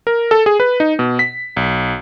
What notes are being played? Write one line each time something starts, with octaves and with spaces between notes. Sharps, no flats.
A#4
A4
G#4
B4
D#4
B2
B6
B1